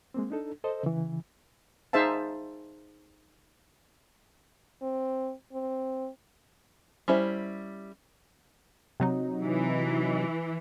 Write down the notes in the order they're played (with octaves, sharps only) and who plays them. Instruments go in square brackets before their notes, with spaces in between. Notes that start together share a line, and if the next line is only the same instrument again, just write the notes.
[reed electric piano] G#3 A#3 C4
D4 D#4 A4
A4 C5 D#5
C#3 E3
[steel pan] D#4 G#4 C5 E5 F5 A5
[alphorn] C4
C4
[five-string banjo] G3 C#4 E4 C5
[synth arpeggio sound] C3 F#3 D#4
[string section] E3